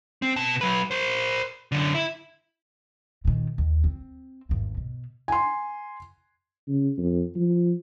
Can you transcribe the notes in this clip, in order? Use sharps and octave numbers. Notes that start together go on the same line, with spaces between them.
C4
B2 A5
F#3 B4
A#4 C5
F#2 D3
E4
A#2 D#3
D#2
C4
G#1 E2
B2
G#5 C6
C#3
F2
F3